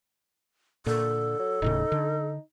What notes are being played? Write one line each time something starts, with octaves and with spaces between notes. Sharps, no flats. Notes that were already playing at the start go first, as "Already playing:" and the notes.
A#2 D3 A4
F#3
D#1 A2 C#3 D#4
D3